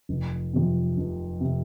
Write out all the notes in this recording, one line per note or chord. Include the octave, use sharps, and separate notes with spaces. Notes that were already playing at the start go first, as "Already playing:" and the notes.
F1
F2 C3
F1
C3